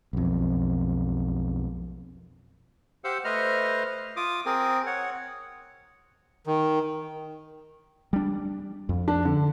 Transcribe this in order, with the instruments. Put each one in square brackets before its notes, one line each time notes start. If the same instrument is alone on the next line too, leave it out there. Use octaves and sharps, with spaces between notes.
[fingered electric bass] B1 F2
[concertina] G4 C5 F5 F#5 E6
A3 B4 C5 D#5 F6
F4 D6 D#6
C4 G#4 A#4
C#5 F#5
[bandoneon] D#3
[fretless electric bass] G3 D4
F2
[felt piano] D4
D3